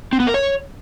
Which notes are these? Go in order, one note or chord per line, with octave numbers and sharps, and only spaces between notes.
C4
B3
A#4
C#5